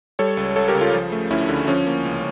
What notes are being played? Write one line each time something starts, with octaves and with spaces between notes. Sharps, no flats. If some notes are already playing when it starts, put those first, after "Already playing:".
G3 A4 C#5
C#2
C#2 A4 C#5
G4 A#4
C#3
F4 A4
F3
A3
D2 C#4 E4
D3
F3 C#4
A#3
C#2